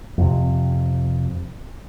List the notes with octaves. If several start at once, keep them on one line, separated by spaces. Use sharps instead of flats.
F2 C3